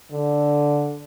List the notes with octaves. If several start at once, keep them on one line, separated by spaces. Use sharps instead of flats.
D3